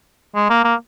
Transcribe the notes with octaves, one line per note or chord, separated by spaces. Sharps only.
G#3
A#3
A#3